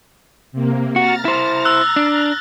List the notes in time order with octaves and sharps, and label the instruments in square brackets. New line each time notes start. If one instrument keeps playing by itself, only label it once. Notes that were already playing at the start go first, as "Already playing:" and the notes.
[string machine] C3 A#3
[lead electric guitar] F#4 [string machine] A#5 F6 A6
[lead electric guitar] E4 C5
[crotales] E6 F#6
[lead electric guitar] D4